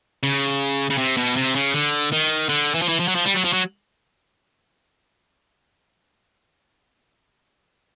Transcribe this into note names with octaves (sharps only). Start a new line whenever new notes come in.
C#3
C#3
C3
B2
C3
C#3
D3
D#3
D3
E3
F3
E3
F3
F#3
F3
G3
F#3
F3
F#3